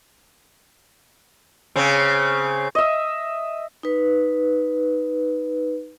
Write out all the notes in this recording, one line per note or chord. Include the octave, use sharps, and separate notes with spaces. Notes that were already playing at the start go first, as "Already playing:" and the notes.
C#3 C4
D#5 E5
D#4 B4